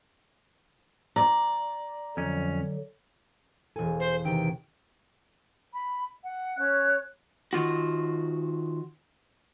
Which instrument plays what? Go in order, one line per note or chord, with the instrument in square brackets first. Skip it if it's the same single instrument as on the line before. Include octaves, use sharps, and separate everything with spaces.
[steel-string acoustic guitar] D5 [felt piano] A#5
[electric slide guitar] F2 C#4 [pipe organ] D3 F#3
[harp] E1 G#5 [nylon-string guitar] A4
[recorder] C5
[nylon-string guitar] C3 D#3 E3 [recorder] G5
[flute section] B5
F#5
C#4 C#5 F#6
[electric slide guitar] D#3 F4 F#4